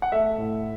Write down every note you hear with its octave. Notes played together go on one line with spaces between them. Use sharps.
F#5
A3 E5
A2